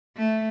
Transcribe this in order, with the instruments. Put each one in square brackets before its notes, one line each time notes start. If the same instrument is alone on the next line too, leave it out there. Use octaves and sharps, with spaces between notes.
[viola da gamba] A3